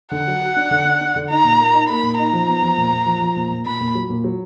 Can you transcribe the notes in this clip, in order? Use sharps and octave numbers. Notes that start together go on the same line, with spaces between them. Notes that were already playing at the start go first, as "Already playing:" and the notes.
D3 F#5
F#3
F#4
D4
D3
D4
D4
D3
D#4 A#5
A#2
A#3
D#4
A#3 B5
A#2
D#4 A#5
F3
B3
F3
A#2
A#2
F3
F3
A#2
A#2
A#2 B5
A#2
F#3
A#2
F#3